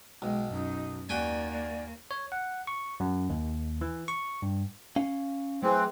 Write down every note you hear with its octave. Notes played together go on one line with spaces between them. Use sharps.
B1 G#3 G5
F#2 D#4
D#2 A#3 F#4 D5 G5 G#5
D5
C#5
F#5
C#6
F#2
D#2
E3
C#6
G2
C#4 F5
E3 F#3 A3 C4 G#4